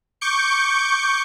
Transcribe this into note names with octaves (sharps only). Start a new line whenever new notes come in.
C#6 D6 G6 C#7